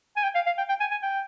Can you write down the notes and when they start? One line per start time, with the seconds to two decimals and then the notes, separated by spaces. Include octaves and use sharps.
0.17 G#5
0.23 G5
0.35 F5
0.46 F5
0.58 G5
0.69 G5
0.80 G#5
0.91 G#5
1.03 G5